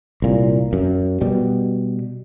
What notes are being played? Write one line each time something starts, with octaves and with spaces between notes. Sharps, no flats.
C2 A#2
F#2
B2 G3